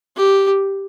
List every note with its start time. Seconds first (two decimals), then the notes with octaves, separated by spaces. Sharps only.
0.17 G4